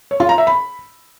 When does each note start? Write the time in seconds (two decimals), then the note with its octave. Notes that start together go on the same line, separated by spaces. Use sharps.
0.11 C#5
0.20 F4
0.29 A#5
0.38 E5
0.47 B5